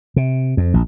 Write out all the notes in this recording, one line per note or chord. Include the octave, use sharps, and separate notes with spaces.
C3
F2
A#1